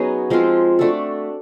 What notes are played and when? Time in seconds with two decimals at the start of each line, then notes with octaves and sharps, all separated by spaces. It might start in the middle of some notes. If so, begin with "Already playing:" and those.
Already playing: F#3 B3 C#4 D#4 G#4
0.30 F3 G#3 C4 F4
0.79 A3 D4 F#4 A4